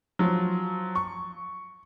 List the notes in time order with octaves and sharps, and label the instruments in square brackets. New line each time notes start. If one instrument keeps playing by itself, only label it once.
[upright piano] F3 F#3
C#6